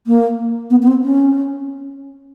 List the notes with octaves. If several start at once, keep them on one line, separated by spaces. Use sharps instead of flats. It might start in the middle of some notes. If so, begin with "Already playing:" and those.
A#3
B3
B3
C4
C#4